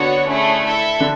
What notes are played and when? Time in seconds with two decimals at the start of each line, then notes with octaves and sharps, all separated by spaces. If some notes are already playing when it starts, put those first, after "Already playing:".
Already playing: D3 B3 D4 F#4 C#5
0.26 A3 C#4 E4 G#4
0.64 E4 A4 E5
1.00 D3 D4